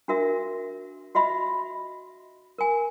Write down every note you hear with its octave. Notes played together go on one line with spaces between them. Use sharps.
D4 F#4 A#4 E5
F#4 D#5 E5 B5
A#4 G#5